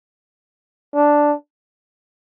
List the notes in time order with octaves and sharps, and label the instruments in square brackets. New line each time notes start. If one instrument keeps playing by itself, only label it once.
[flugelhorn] D4